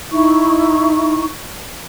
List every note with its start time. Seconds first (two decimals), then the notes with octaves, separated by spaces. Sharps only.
0.12 D#4 E4 C#6